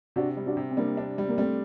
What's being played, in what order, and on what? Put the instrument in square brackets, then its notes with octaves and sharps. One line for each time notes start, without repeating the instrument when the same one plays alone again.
[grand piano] C3 [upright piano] D4 F#4
[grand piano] G3
[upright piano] D4 F#4
[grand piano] C3
[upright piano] C4
[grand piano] G3 [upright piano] A#3 D4
[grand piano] D4
G3
[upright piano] A#3
[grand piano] G3 [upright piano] A3 C4